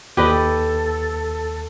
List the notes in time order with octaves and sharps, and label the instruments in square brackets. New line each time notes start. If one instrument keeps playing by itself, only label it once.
[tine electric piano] D#2 [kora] G4 B4 D#5 [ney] A4